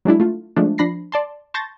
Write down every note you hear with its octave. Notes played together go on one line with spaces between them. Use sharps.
F#3 G#3 D4 E4
A3 F4
F3 G#3 A3 D4
F3 D4 B5 A#6 C7
D5 A5 C6
A5 C6 C#6 G6 A6 A#6